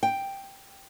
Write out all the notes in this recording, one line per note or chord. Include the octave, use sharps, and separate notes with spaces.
G5